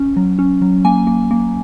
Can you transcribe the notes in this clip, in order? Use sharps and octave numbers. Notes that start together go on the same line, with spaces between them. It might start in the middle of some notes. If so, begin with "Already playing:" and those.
Already playing: C#4
F#3
C#4
F#3
A#3 G#5
A#3
A#3